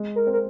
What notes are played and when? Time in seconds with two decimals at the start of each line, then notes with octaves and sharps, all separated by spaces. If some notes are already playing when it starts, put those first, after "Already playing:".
Already playing: G#3
0.16 A#4
0.27 C4
0.33 A#4